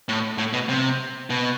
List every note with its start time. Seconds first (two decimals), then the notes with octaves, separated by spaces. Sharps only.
0.09 A2
0.38 A2
0.53 B2
0.69 C3
1.30 B2